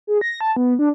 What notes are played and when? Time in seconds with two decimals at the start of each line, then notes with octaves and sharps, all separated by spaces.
0.07 G#4
0.21 A#6
0.41 A5
0.57 B3
0.79 D4